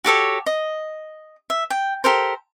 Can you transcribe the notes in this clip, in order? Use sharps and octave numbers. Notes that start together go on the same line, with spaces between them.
F#4 G4 A4 C#5
D#5
E5
G5
G4 A4 A#4 C5